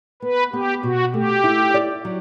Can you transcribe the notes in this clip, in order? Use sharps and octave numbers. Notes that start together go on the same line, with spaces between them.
B3 B4
B3 G4
B2 F#4
A3 G4
E4
D5
F#3